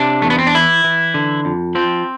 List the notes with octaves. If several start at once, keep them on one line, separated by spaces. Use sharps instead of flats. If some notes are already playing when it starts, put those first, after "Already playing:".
Already playing: C3 D4
E2 A3
B3
C4
D4
E3 E4
E3
D3
F2
F3 C4